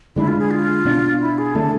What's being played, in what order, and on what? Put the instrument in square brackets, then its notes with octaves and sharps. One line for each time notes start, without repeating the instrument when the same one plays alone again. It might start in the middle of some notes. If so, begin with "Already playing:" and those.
[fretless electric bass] D3 G#3 D4 [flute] E4
[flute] F4
G#4
F4
[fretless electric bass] B2 B3 D4
[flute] E4
G#4
[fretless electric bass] D3 A3 D4 [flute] A4